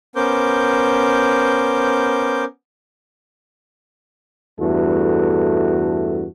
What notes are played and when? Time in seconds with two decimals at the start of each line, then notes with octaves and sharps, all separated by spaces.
0.16 B3 C#4 A#4 C5 D6 G6
4.60 E2 G2 A3 F#4 A4